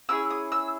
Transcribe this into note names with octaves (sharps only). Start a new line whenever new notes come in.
C#4 E4 G#4 E6
D#6
E6